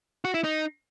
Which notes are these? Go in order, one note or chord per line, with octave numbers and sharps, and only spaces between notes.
F#4
E4
D#4